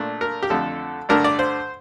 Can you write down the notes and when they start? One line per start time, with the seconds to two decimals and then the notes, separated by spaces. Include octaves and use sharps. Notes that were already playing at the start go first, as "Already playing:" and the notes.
Already playing: A#2 A3 D4
0.21 A#4
0.43 G4
0.50 F2 D3 F3 A3 A4
1.09 G2 D3 A3 D4 A#4
1.24 D5
1.39 C5